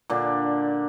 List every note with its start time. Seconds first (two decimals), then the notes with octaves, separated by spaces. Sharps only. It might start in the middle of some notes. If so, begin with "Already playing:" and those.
0.10 A#2 D3 D4